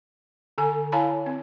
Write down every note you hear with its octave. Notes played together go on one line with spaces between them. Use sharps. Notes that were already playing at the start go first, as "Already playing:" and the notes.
D3 A4 G#5
E4 C#5 F5 G#5 A5 B5
C4